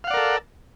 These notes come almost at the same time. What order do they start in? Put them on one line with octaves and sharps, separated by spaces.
F5 F#5 D5 A#4 A4